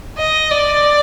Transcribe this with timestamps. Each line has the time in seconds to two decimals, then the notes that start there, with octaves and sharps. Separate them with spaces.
0.18 D#5
0.51 D5